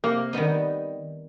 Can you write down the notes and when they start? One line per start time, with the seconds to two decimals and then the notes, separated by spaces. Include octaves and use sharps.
0.04 C3 A#3
0.33 D#3 G3 B3 D#4